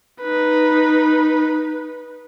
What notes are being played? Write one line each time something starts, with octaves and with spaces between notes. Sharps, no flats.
D#4 B4